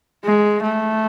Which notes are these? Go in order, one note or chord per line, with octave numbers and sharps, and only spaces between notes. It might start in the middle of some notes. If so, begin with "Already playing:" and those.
G#3
A3